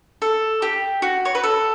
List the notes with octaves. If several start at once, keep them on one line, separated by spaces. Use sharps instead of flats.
A4
G4
F#4
C#5
B4
A4